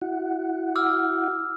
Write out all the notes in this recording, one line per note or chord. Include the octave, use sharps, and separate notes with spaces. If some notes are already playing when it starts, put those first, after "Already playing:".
E4 F#4 F#5
D6 E6 F6